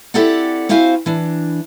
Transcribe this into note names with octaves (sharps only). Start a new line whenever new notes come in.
C4 E4 G4 A4 D5 F#5
C4 E4 F#4 C5 F5 G#5
E3 D4